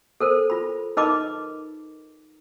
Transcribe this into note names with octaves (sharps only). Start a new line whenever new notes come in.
A4 A#4 C5
F4 B5
D#4 A#4 B4 D#5 B5 D6